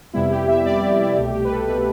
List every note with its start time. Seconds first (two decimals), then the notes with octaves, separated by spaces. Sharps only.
0.13 F2 C3 G3 B3 E4
0.31 G4
0.48 E5
0.65 F2 C3 G3 B3 D5
0.82 G4
0.99 E4
1.16 C2 B2 A3 G4
1.33 G4
1.45 B4
1.51 A4
1.67 B2 A3 B4